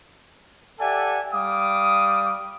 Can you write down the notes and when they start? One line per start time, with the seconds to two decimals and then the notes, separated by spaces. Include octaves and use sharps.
0.80 G4 A4 D5 E5 F#5 G#5
1.33 G3 F5 D6 D#6